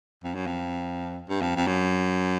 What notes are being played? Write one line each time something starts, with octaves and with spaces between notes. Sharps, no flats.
F2
F#2
F2
G2
F2
F2
F#2